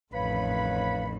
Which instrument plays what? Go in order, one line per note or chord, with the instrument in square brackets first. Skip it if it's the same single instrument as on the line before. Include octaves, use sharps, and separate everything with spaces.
[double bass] A1 [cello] F2 D#3 [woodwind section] B4 C#5 B5 [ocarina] F5